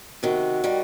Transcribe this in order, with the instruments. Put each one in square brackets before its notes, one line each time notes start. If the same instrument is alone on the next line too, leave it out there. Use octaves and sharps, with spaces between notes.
[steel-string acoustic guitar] C3 D#3 [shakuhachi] F#4
[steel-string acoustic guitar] D#3 G3